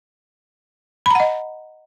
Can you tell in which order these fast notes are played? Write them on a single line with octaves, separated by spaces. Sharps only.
B5 A#5 F#5 D#5